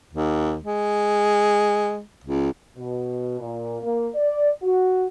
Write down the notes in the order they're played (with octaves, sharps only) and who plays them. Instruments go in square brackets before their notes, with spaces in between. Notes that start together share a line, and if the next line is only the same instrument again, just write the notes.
[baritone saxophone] D#2
G#3
C#2
[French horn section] B2
A#2
A#3
D5
F#4